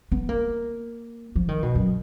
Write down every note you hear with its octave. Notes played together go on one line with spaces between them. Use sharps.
B3
A#3
F3
D#3
B2
F#2